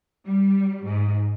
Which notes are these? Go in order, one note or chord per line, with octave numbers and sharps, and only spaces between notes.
G3
G#2